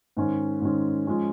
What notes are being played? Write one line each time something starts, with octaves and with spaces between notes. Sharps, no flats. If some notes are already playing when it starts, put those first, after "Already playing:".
G#2 D#3 G#3 C#4
G#2 D#3 G#3 C#4
F3 G#3 C#4